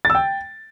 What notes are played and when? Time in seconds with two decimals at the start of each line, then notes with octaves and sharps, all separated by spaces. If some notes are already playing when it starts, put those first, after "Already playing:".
0.05 A6
0.10 E6
0.15 G5